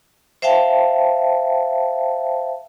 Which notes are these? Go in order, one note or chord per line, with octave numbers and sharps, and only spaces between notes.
C5 E5 F5 G5 A5